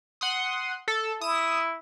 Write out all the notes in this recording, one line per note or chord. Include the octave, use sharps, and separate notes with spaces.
F#5 C6 D#6
A4
E4 D#6 E7